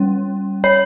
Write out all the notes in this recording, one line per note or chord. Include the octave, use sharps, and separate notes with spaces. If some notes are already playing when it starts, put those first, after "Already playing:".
Already playing: G3 C#4
C#5